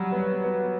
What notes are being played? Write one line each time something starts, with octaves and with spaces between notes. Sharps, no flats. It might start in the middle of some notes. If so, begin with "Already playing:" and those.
Already playing: F#3 G3
B3
B3